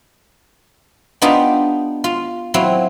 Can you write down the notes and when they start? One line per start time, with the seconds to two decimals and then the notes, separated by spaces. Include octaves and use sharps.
1.22 B3 D4 D#4 F4 G4
2.04 F4
2.54 F#3 C4 E4 F4